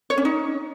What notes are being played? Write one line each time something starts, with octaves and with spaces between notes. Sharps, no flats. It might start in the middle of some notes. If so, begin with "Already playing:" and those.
C#5
C#4
D#4